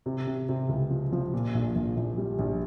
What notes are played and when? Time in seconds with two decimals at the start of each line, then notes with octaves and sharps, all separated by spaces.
0.06 C3
0.27 C3
0.49 C3
0.69 C#2
0.90 F3
1.12 F3
1.34 A#2
1.55 A#1
1.75 A#1
1.97 A#1
2.17 G3
2.39 A#1